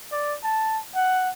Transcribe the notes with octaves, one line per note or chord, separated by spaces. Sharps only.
D5
A5
F#5